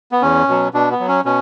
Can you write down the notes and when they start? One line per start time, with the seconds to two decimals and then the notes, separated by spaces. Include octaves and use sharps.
0.12 B3
0.22 E2 C#4
0.49 B2 F#3
0.74 B2 D4
0.91 B3
1.00 F#3
1.08 C#4
1.25 B2 C#4